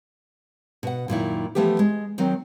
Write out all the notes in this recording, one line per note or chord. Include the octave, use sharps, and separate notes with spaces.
B2 F#5
F#2 A#2 D#3 E4
E3 F3 A3 B3 G4
G#3
D#3 F#3 C4